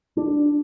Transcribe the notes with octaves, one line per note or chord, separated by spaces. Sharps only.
D4